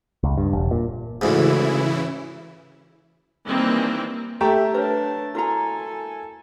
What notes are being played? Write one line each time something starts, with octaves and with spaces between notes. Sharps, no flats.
C#2
G2
E1
A#2
D2 G#2 C#3 E3 E4
D#3 E3 G3 A#3 C4
A3 G4 E5 G5 A#5
D4 A#4 B4 C#5 A5
E4 F#4 A4 A#4 G#5 A#5